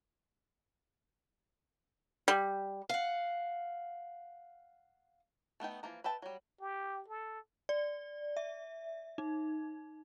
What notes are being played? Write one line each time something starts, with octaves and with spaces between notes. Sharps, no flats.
G3
F5 F#5
A3 B3 D#4 G5
E3 F3 A#3 A#5
B4 E5 G5 A5
F#3 G3
G4
A4
D5
E5
D#4